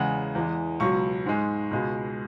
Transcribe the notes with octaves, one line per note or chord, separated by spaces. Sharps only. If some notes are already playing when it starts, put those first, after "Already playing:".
Already playing: E2 C#3 G#3 F#5
E2 E3 G#3
C#2 B2 F#3 C#6
G#2 G#3
C#2 B2 G#3